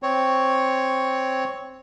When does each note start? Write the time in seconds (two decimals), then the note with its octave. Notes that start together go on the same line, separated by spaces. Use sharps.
0.03 C4 C#5